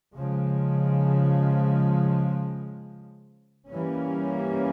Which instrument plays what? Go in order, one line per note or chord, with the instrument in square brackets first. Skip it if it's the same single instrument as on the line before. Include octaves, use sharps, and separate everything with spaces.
[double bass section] C#3 F3 G#3
E3 G3 A#3 C#4